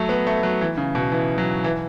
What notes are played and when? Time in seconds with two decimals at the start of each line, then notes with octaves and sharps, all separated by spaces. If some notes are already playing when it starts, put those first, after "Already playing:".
Already playing: F#3 A3
0.09 B3
0.27 A3
0.43 F#3
0.61 E3
0.77 C#3
0.95 B2
1.12 E3
1.38 F#3
1.64 E3